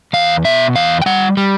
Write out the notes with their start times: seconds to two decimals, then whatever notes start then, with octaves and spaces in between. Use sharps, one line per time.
0.13 E2 F5
0.45 B2 E5
0.75 E2 F5
1.02 G5
1.06 G3 F#5
1.37 G3